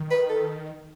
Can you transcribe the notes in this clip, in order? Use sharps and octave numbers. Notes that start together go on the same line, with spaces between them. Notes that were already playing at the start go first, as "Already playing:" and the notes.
Already playing: D#3
B4
A4